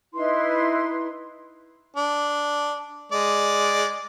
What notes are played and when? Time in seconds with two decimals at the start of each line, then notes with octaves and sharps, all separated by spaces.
0.14 D#4 E4 B4 C6
1.97 D4
3.12 G#3 D5